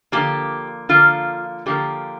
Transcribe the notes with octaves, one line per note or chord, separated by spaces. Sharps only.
D3 F3 A#3 G4
D3 F3 A#3 F4
D3 F3 A#3 G4